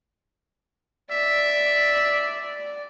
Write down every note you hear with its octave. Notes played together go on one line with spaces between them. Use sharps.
D5 E5